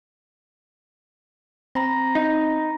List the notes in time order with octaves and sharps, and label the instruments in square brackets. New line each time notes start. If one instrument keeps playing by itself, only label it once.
[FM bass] C4 [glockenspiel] A#5 B5 A#6
[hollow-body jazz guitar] D#4